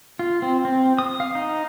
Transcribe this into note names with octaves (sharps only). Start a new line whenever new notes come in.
F4
C4
C4
D#6
F5
D#4